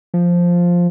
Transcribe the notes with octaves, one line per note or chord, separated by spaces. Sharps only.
F3